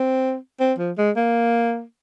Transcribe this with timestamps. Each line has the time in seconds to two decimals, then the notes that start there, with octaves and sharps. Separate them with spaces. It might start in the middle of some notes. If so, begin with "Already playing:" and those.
Already playing: C4
0.60 C4
0.78 F3
0.98 G#3
1.16 A#3